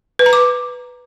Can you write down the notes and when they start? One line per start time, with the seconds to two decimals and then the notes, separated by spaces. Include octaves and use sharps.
0.19 B4
0.26 A#5
0.33 D6